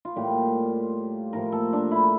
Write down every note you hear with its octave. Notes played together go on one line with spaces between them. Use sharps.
F4
A2 G3 A#3 G4
A2 F3 A#3 A#4
A4
D4
E4